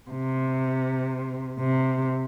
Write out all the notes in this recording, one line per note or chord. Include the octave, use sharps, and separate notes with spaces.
C3
C3